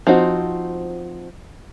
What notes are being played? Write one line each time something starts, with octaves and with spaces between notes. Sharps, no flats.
F3 C4 D#4 F#4